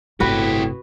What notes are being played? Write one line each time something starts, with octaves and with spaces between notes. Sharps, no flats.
G1 A2 C3 E4 F#4 G4 B4